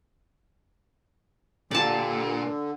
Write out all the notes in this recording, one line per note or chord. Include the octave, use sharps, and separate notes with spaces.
A#2 D3 G4 D5 A5